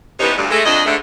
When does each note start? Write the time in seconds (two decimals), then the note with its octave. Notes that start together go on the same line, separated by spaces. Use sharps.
0.20 G2 C3 E3 B3 C#4 D#4
0.37 D2 G2
0.51 G#3 A3
0.66 F2 D4 D#5
0.85 G#2 D3 A3